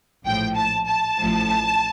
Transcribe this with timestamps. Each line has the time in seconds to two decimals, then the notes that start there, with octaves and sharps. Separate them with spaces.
0.25 A#1 A2 F3 G5
0.55 A5
0.87 A5
1.17 A1 A2 F3